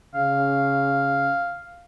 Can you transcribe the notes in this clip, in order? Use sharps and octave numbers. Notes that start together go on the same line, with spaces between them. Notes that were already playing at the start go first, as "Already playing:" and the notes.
C#3 F5